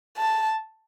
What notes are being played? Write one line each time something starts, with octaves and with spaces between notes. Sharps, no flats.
A5